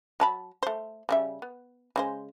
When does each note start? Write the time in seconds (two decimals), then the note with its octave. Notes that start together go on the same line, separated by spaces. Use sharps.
0.20 F#3 A5 B5
0.63 A3 C5
1.09 C#3 G3 E5
1.42 B3
1.96 C#3 G#3 C5